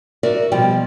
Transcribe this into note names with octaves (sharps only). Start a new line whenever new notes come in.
F#4 A#4 D5 E5
B2 F3 G3 G5